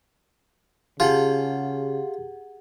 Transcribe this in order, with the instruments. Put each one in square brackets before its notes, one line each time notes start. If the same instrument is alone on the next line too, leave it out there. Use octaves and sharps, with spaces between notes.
[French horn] C#3 [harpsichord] F4 [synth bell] G4 G#4 F#5